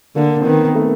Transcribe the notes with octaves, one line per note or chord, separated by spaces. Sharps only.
D3 A#3
C4
D#3 B3
A3